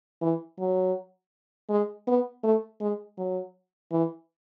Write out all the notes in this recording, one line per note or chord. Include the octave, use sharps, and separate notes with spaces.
E3
F#3
G#3
B3
A3
G#3
F#3
E3